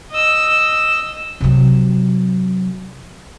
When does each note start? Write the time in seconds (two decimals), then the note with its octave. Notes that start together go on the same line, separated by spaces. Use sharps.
0.11 D#5 E6
1.41 C3 F#3